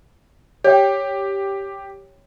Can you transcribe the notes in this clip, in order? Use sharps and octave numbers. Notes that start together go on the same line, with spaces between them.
G4 C#5 G5